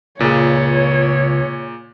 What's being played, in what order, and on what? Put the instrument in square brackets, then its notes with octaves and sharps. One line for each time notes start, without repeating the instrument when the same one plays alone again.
[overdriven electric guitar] C#2 [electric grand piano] A#2 G#4 [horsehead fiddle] C#5